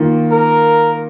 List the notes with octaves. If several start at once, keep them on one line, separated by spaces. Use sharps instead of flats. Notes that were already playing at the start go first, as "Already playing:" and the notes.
Already playing: D#3 A#3 F4
A#4